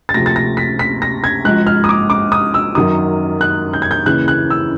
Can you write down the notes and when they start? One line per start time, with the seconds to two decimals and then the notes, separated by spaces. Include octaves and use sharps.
0.09 A6
0.14 D2 C3 F3 A#6
0.26 A6
0.36 A#6
0.57 B6
0.79 B6
1.02 A#6
1.24 G#6
1.45 G#1 G#2 F3 F#6
1.67 F6
1.84 D#6
1.89 D6
2.10 D6
2.32 D#6
2.54 E6
2.75 F#2 D#3 F#3 D#6
3.41 F#6
3.73 G6
3.82 G#6
3.91 G6
4.06 D#2 C#3 E3 F#6
4.28 F#6
4.50 E6